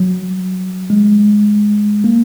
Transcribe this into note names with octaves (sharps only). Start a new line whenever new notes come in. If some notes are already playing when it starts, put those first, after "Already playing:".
Already playing: F#3
G#3
A#3